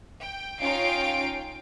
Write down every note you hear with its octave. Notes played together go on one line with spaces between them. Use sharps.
G5
C#4 D#4 F4 F5 G5 D7